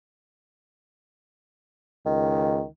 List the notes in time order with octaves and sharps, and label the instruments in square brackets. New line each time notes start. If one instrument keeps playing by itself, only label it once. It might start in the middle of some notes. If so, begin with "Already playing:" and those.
[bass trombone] C#2 [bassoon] D#3